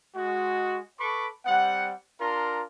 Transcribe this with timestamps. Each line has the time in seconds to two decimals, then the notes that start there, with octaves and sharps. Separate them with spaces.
0.15 G#3 F#4
1.00 A4 B4 B5 C#6 D6
1.46 G3 C4 F#5
2.21 D4 F4 A#4 A#5 C6